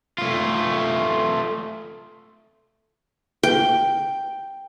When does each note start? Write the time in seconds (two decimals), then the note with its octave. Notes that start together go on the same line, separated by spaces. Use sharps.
0.18 A3 F4
3.43 G5